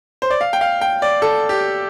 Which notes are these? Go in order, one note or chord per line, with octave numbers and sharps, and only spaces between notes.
C5
D5
F5
G5
F5
G5
D5
A4
G4